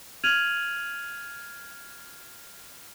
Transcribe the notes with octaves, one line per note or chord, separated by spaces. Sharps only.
F6 G#6 D#7 F7 F#7